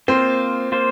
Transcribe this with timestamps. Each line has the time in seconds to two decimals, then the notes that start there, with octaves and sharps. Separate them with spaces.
0.08 A#3 C4 F4 C5
0.72 A#3 F4 C5